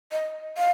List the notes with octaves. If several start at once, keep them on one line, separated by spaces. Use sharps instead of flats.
D#5
F5